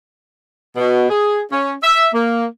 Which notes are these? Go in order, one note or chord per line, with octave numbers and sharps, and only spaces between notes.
B2
G#4
C#4
E5
A#3